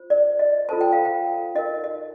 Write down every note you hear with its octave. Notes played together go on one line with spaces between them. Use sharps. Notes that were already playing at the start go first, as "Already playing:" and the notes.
Already playing: F4 C5
D5
D#5
F4 A4 C5 A5
G5
F5
G5
D#4 A#4 D#5
D#5